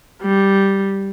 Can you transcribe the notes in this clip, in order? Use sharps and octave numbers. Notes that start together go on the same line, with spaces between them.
G3